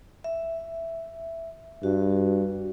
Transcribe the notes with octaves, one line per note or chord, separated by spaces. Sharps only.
E5
G2 F#4